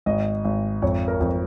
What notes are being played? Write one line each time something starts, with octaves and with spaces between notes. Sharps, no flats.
G#1 D#5
G#1
F2 C#5
A#4
F2